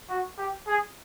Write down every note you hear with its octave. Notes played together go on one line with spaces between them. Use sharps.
F#4
G4
G#4